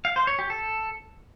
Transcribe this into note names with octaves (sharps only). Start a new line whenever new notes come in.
F5
C5
C#5
G4
A4